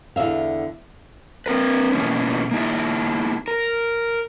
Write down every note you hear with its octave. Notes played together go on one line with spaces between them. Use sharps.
E2 D3 E5 F5
C4 A#4 B4
B2 E3 A#3 C#4
A#3 D#4 E4
A#4